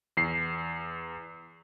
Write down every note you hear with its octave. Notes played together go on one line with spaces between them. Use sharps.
E2 C7